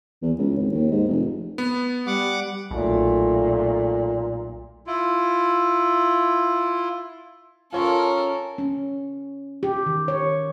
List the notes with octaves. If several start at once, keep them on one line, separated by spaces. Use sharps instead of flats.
E2
C#2
G#1
D#2
G#2
F1
B3
G3 F#5 D6
B1 A#2 A3
E4 F4
C#4 F4 A4 A#4 C#5 C6
C#4
G4
D#3
C#5